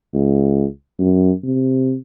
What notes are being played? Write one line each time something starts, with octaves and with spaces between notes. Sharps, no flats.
C#2
F#2
C3